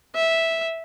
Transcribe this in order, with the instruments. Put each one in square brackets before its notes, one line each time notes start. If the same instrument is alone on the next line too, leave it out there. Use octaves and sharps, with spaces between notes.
[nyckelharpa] E5